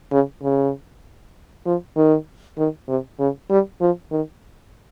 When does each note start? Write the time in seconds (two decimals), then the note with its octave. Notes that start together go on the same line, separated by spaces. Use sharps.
0.12 C#3
0.43 C#3
1.66 F3
1.97 D#3
2.58 D#3
2.88 C3
3.19 C#3
3.50 G3
3.81 F3
4.12 D#3